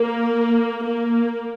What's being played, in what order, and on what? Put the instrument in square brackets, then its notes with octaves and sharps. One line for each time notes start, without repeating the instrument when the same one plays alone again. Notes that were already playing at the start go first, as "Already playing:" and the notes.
Already playing: [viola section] A#3
A#3